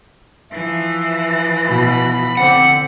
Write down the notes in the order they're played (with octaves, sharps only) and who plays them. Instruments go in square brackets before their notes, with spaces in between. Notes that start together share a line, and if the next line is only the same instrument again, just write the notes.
[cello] E3 F3 [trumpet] E5
[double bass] B2 [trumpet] B5
[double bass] D3 C4 [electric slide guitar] F#5